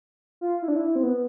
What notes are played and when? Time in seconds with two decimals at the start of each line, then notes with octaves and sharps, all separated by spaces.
0.41 F4
0.62 E4
0.68 D4
0.76 E4
0.96 C4
1.03 B3